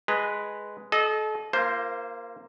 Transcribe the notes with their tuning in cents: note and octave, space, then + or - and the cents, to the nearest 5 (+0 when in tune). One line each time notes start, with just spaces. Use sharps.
G#3 +0 B4 +0 A#5 -30
A4 -35 D#5 +0
A#3 +0 F4 -35 C5 +0